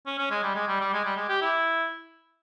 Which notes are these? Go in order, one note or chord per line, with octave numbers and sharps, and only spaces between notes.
C#4
C#4
G#3
G3
G#3
G3
G3
G#3
G3
G#3
G4
E4